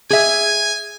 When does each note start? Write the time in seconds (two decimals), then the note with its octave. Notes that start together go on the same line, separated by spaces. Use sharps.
0.10 G#4 E5 G#5